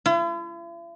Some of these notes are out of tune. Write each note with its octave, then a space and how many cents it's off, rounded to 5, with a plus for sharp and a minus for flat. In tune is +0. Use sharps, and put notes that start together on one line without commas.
E4 +45